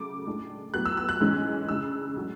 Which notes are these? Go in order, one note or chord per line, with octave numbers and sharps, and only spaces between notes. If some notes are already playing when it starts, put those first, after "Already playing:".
Already playing: C#3 F#3 A3 D6
A2 G#3 D4
A2 F#3 B3 F#6
E6
E6
F#6
G#2 E3 G#3 C#4
C#3 G#3 D4 E6
A2 F#3 A3 C#4